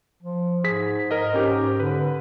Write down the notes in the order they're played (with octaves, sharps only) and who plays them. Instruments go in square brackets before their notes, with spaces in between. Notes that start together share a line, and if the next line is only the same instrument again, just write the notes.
[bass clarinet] F3
[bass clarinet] G#2 [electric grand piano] G#4 B6
[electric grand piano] A#4 D#5
C#4 G4 A#4
[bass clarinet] D3 [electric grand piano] B4